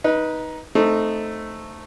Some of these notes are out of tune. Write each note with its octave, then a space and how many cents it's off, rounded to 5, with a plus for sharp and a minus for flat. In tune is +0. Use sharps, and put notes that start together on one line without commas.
D#4 +10 B4 -15
A3 +0 C4 +0 D#4 -15